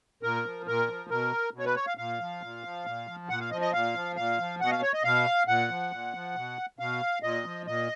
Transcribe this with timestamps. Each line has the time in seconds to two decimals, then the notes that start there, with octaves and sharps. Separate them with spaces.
0.23 A#2 A#4
0.45 F3
0.67 A#2 A#4
0.88 F3
1.10 B2 A#4
1.54 B2
1.59 C#5
1.65 B4
1.76 C#5
1.87 F5
1.97 A#2 F5
2.20 F3
2.41 A#2
2.64 F3
2.85 A#2
3.07 F3
3.29 A#2 F#5
3.40 F5
3.51 F3 D#5
3.61 D#5
3.73 A#2 F5
3.95 F3
4.16 A#2 F5
4.39 F3
4.60 B2 F#5
4.66 D#5
4.71 F5
4.82 C#5
4.93 D#5
5.04 B2 F5
5.48 A#2 F#5
5.70 F3
5.91 A#2
6.14 F3
6.35 B2
6.79 B2 F5
7.23 A#2 D#5
7.45 F3
7.66 A#2 D#5